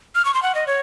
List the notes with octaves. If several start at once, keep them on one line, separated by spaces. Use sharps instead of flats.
F6
C#6
C6
F#5
D#5
C#5